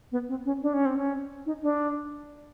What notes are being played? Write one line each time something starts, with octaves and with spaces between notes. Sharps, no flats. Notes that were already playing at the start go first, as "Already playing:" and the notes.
B3
C4
C#4
D4
C#4
C4
C#4
D#4
D4